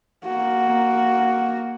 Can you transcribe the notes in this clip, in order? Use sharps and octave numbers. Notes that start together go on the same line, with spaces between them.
A#3 F#4